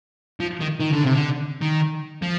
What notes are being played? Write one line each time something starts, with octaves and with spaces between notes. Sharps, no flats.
F3
D#3
D#3
D3
C3
D3
D#3
F3